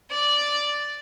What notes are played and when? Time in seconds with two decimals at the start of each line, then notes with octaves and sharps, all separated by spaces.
0.10 D5